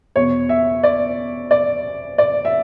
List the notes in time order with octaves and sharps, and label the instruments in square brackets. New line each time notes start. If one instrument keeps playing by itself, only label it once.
[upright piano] E2 B2 C#5
E5
D5
D5
D5
E5